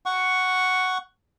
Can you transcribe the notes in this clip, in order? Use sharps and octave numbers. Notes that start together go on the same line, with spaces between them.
F#5 C#6